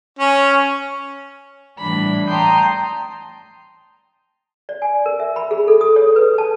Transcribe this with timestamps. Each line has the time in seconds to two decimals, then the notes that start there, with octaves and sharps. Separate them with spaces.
0.19 C#4
1.78 A2 E3 G3 D4 B5
2.28 G5 A5 A#5 C6 D#6 G6
4.69 D5
4.82 G#5
5.06 A#4
5.20 E5
5.36 B5
5.51 G#4
5.68 A4
5.81 D#6
5.96 C#5
6.16 B4
6.38 A5